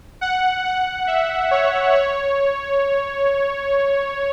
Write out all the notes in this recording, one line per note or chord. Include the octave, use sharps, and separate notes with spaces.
F#5
F#5
E5
C#5
C#5